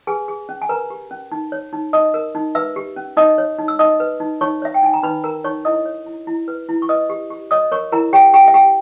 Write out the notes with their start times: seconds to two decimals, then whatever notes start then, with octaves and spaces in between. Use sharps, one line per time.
0.07 G#4 B4 G#5
0.28 G#4
0.49 C#4
0.62 G#5
0.69 A#4 B4 A#5
0.90 G4
1.11 C#4
1.32 D#4
1.52 C#5
1.73 D#4
1.93 D#4 D#5 D#6
2.14 A#4
2.35 D#4
2.55 B4 E5 E6
2.76 G4
2.96 C#4
3.17 D#4 D#5 D#6
3.38 C#5
3.59 D#4
3.68 E6
3.79 D#4 D#5 D#6
4.00 B4
4.20 D#4
4.41 D#4 C#5 C#6
4.62 C#5 E5
4.74 G5
4.82 D#4 G#5
4.94 A#5
5.03 D#4 B4 B5
5.24 A#4 A#5
5.44 D#4 C#5 C#6
5.65 E4 D#5 D#6
5.86 C#5
6.06 E4
6.27 E4
6.48 B4
6.69 E4
6.82 C#6
6.89 B4 D#5 D#6
7.10 G4
7.30 G4
7.51 C#5 D#5 D#6
7.72 A#4 C#5 C#6
7.92 E4 A#4 A#5
8.13 G4 C#5 G5
8.34 G4 G5
8.48 E5
8.54 G4 G5